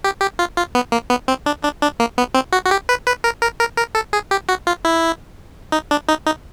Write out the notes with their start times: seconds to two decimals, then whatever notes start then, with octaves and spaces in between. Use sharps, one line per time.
0.04 G4
0.21 G4
0.39 F4
0.57 F4
0.75 B3
0.92 A#3
1.10 B3
1.28 C4
1.46 D4
1.63 D4
1.82 D4
2.00 A#3
2.18 B3
2.34 C4
2.53 F#4
2.65 F#4
2.71 G4
2.89 B4
3.07 B4
3.24 A#4
3.42 A#4
3.60 A#4
3.77 A#4
3.95 A4
4.13 G#4
4.31 G4
4.49 F#4
4.67 F4
4.85 E4
5.72 D#4
5.91 D4
6.08 D#4
6.26 D#4